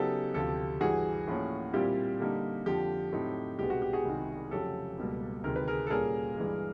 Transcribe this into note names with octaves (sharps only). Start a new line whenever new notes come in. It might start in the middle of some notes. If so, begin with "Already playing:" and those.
Already playing: C#3 F#3 B3 D#4 G4 A4
D2 C3 F3 G4 A4
G2 E3 G3 F#4 G#4
A2 F3 A#3 C#4
A#2 G3 C4 E4 G4
D3 G3 A#3 D#4
F2 D3 F3 G4
A2 F#3 A3 C4 D#4
C2 B2 G#3 B3 G4
F#4
G4
F#4 G#4
C2 C3 D#3 G#3
F2 C#3 F#3 A3 G4 A4
C#2 B2 G3 A#3
D2 C3 D#3 G#3 A#4
B4
G#4 A#4
A4
A#2 G3 A#3 C#4 G#4 A#4
G2 E3 G#3